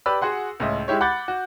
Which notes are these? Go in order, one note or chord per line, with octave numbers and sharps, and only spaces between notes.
G4 B4 D5 B5 E6
F#4 G#4 F#5 C6
C#2 A2 D#5 E5
G#3 E4 G4 C#5
F#5 B5 D6 F#6 G6 A6
F#4